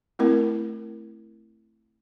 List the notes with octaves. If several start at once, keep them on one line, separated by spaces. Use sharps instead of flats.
A3 C4 E4 A#4